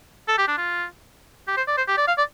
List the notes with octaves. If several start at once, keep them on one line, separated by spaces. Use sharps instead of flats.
A4
G4
D4
F4
G4
C5
D5
C5
G4
D5
F5
D5